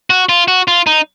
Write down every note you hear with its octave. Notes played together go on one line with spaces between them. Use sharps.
F#4
F4
F#4
F4
D#4